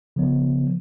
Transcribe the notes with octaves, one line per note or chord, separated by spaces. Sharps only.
C#3 F3 B3